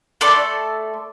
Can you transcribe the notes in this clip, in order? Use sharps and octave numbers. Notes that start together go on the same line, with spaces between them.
A3 A4 D5 C6